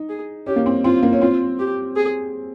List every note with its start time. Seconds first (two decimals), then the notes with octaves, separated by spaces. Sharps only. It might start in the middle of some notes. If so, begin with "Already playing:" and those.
Already playing: D#4
0.09 G#4
0.47 C#4 G4
0.56 A#3
0.66 C4
0.84 C4 F4
1.03 A#3
1.13 C#4
1.21 C4 F4
1.59 G4
1.96 G#4